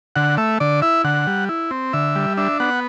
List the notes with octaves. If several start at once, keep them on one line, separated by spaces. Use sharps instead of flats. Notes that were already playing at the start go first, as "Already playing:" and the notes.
D3 F#5
A3 E5
D3 D5
E4 E5
D3 F#5
G3
E4
C4
D3 E5
G3
D4 E5
B3 F#5